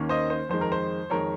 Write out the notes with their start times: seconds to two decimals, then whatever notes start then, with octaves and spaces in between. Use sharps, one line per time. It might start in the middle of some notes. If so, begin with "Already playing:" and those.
Already playing: D#2 D#3 A#3 C#4
0.09 C5 D#5
0.30 C5
0.49 F2 D#3 G#3 C5
0.61 A#4
0.72 C5
1.10 F2 D#3 G#3 A#4 C#5